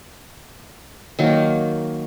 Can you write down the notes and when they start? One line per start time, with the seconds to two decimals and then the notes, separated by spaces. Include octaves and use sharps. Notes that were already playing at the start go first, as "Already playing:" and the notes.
1.19 D#3 F#3 A#3